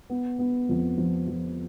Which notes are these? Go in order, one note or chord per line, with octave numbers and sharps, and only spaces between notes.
B3
B3
F2
F3
F3